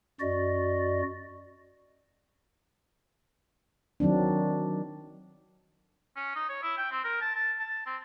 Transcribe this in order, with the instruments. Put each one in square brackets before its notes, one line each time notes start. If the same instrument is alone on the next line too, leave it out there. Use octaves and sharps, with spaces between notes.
[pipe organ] F#2 F#4 D5 D#5
[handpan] D#3 F#3 C4 D4
[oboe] C#4
D#4
C#5
E4
G5
C4
A#4
A5
A5
A5
C4